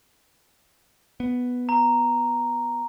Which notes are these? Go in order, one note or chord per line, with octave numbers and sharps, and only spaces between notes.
B3
A#5